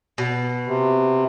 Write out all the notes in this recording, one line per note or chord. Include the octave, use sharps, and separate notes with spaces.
B2
C3